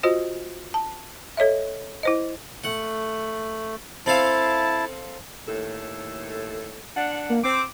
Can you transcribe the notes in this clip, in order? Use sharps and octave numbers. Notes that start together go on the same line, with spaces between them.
F4 F#4 C5 D#5
A5
A4 C#5 D#5 E5
E4 C5 D#5
A3 F#5
C4 E4 A4 F5 A5
D#2 A2 A4
D4 F#5
A#3
C4 D6